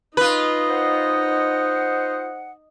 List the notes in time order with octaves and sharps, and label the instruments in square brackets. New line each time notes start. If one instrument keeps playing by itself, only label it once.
[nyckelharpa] D#4 D#5 [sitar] F4 B4
[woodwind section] C5 F#5